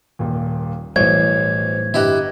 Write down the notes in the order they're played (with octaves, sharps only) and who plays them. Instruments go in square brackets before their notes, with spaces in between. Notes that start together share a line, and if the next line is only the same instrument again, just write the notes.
[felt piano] D#1 A#2
[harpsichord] B1 [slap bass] A2 G3 [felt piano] E3 C5 C#5 [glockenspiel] G#6
[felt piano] G1 D#5 F#6 [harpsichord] E4 G4